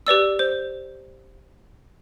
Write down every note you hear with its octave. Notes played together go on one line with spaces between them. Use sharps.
G4 B4 D5 E6
C5